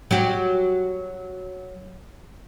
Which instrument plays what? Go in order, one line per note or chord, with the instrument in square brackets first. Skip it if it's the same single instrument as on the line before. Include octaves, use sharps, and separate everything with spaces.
[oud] F#3 G4